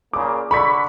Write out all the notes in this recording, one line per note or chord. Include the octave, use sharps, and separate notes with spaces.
A#2 C#3 A#3 D6
D3 B5 C#6 B6